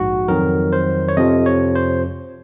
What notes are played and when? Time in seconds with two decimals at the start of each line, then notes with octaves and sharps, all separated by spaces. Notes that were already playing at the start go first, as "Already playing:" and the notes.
Already playing: A#1 G#2 F#4
0.28 F2 D#3 F#3 A#4
0.73 C5
1.09 C#5
1.17 F2 C3 F3 D#5
1.46 C#5
1.75 C5